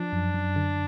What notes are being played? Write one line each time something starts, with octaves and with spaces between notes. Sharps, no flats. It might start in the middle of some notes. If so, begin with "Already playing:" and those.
Already playing: F3 D4
F#2
F#2
D3